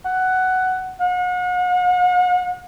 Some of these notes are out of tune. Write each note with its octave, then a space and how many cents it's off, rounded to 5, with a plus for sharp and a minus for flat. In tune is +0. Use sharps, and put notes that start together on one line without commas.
F#5 +10
F#5 -40